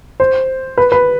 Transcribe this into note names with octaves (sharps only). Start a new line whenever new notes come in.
C5
B4
B4